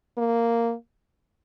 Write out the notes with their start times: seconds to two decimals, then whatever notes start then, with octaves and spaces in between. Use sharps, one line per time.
0.18 A#3